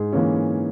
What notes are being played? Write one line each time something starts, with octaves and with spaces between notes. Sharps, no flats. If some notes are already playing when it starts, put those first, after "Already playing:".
Already playing: G#2 G#4
E3 A#3 C#4